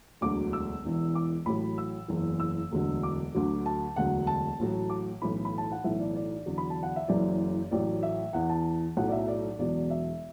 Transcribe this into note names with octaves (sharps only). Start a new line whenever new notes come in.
E1 D2 D3 F#3 D6
E6
E1 E2 E3
D6
A1 A2 F#3 B5
E6
F#1 E2 E3
E6
E1 D2 D3 F#3
D6
D2 D3 F#3
A5
E1 D2 D3 F#3 F#5
A5
A1 A2 F#3
D6
B1 A2 E3 B5
B5
A5
F#5
B1 A2 E3 E5
D5
D5
E2 D3 F#3
B5
A5
F#5
E5
F#1 F#2 E3 D5
A1 A2 F#3 D5
E5
E2 E3 F#5
A5
B1 A2 F#3 F#5
D5
E5
D5
E1 E2 B2 F#3 D5
E5